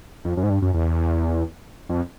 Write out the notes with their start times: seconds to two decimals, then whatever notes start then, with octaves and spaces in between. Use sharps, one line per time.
0.25 F2
0.37 F#2
0.43 G#2
0.50 G2
0.62 F#2
0.74 E2
1.89 F2